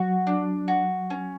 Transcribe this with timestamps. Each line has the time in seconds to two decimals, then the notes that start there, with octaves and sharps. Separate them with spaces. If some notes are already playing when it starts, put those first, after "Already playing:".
Already playing: F#3 F#4
0.27 D4
0.68 F#4
1.10 C#4